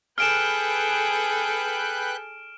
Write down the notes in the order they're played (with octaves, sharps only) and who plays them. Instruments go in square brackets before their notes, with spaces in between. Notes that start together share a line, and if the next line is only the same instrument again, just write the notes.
[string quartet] G#4 A4 [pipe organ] B4 G5 F#6 [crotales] F6 D7 E7